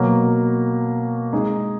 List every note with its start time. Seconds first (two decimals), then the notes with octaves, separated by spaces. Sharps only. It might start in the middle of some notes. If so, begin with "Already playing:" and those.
Already playing: B2 F#3 A#3
1.33 G#3 D#4 G#4